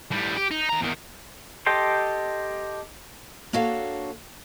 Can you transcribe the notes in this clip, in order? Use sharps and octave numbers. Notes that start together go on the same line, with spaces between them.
A2 G3
G4
D#4
D#2 A#5
E2 D#3
G4 A4 D#5 G5 C6
A#3 D4 F#4 A4 C#5 F5